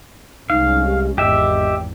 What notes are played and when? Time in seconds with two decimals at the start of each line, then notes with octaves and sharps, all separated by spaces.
0.50 C2 G#3 C#4 D#4 F5
0.86 G4
1.18 G#1 E2 G4 D#5 E5